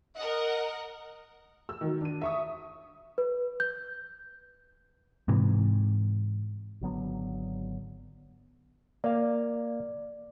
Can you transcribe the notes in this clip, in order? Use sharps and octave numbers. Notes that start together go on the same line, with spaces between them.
A#4 D#5 F#5
E6
D#3 F#3
D4 D#7
E5 C#6 D#6
B4
G6
G#2 C3 E3
G#1 D3 F#3 B3
A#3 D5 F5